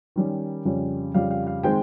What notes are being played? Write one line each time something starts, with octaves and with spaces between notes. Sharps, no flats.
D#3 G3 C#4
F2 C#3 G3 C#4
F2 C#3 G3 C#4 F5
F5
F5
D#3 G#3 C4 G5